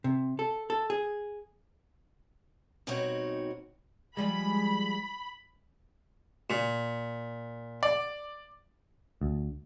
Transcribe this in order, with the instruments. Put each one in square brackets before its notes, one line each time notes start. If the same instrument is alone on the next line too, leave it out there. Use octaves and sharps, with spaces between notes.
[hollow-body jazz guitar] C3
A4
A4
G#4
[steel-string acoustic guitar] B2 G3 C4 D#4 F#4 C#5
[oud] F3 G3 G#3 [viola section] B5
[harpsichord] A#2
[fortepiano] D5
[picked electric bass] D2